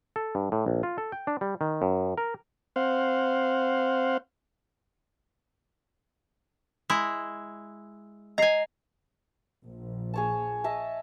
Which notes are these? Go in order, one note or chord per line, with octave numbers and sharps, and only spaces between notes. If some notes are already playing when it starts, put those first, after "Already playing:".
A4
G2
A2
A#1
F4
A4
G5
D4
G3
D#3
F#2
A#4
C4 C5 F5 F#5
G#3 E4
D#5 G#5 A#5 C7
A#1
G#4 C#5 A5
D#5 E5 A5